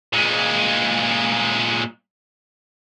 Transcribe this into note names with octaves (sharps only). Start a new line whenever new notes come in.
A#2 G#3